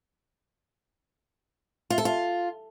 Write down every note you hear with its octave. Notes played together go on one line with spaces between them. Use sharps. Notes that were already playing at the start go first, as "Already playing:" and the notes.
F4
A4
F4